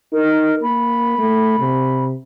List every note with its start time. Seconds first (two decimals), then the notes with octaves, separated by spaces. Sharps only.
0.13 D#4 A#4
0.63 A#3 B5
1.19 A3
1.60 C3